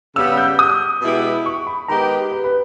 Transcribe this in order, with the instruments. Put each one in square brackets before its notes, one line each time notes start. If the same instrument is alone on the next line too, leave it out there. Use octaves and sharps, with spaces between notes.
[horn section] C#3 G3 B3 [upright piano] E6
[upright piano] G6
D#6
[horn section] B2 G#3 B3 E4 G4
[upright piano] C#6
B5
[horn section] D#3 G#3 B3 G4 [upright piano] A#5
[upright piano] B4
B4